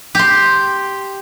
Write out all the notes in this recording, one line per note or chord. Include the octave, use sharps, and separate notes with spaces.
G4 C6